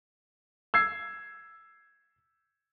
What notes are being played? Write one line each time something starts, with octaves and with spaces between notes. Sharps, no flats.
E6 G#6 C7